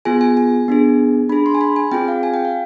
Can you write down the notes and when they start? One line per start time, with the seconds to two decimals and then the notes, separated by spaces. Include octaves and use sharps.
0.05 B3 F4 G#4 G#5
0.21 G#5
0.37 G#5
0.68 B3 D4 G#4
1.29 D4 G#4 B5
1.46 C6
1.55 G#5
1.61 B5
1.76 G#5
1.91 C4 F4 G#4 G5
2.08 F5
2.23 G#5
2.34 G5
2.45 F5